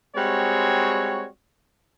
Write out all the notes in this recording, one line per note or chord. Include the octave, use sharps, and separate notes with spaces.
G3 G#3 C4 F#4 C#5